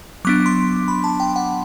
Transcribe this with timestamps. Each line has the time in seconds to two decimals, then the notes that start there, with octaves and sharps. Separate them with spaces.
0.25 F#3 B3 D4 D6
0.46 C6
0.88 B5
1.04 A5
1.20 G5
1.36 F#5